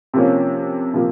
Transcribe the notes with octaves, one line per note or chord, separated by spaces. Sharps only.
C3 F3 A#3 C#4
C3 F3 A#3